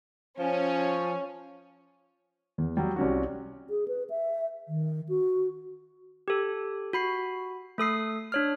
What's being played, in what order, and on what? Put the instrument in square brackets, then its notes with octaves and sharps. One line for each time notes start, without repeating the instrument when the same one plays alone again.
[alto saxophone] F3 [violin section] C#4
[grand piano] E2
F#3 G3
C2 C#4 F#4
[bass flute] G#4
B4
E5
D#3
F#4
[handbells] G4 A4
F#4 B5 C7
A3 A4 D#6 C7
D4 C#5 F6